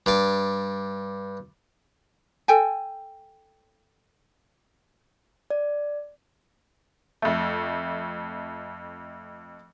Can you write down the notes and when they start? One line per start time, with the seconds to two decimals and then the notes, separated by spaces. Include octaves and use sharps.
0.06 G2 D5
2.48 A4 G5 G#5
5.50 D5
7.22 F2 A3